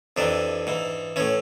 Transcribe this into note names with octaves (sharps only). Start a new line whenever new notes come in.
F2 C3 E3 D4
G#2 E3
A2 E3 C#4